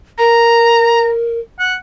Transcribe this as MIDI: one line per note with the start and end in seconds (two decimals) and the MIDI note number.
0.18 1.39 70
0.18 1.09 82
1.59 1.74 78